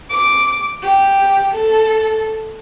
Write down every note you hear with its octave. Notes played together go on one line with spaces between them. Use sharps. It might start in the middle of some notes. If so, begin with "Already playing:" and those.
D6
G4
A4